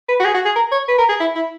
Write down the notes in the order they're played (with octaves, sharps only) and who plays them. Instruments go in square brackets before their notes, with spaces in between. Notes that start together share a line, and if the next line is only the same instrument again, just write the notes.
[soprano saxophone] B4
F#4
G#4
F#4
G#4
A#4
C#5
B4
A#4
G#4
E4
E4